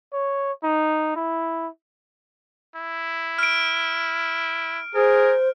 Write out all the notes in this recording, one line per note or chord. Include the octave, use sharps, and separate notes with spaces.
C#5
D#4
E4
E4
F6 D7
G#4 A#4 C5